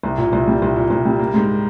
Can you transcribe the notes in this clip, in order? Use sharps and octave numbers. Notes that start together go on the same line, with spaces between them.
C2
A#2
C2
G3
C2
A#2
C2
G3
A#3
G#2